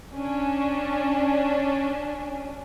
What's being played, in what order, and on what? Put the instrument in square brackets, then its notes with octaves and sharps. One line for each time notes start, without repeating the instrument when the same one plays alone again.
[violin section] C#4 D4